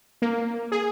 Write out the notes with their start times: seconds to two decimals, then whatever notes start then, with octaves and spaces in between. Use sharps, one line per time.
0.22 A#3
0.72 G#4